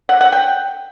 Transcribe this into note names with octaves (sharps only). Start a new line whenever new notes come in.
F#5
F#5
G5